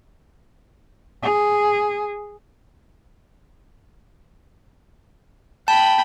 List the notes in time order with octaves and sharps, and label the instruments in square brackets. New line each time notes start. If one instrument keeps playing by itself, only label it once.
[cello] G#4
[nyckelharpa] G5 B5 [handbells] A5